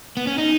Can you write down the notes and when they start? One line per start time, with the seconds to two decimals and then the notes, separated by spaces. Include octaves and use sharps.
0.17 B3
0.27 C#4
0.38 D#4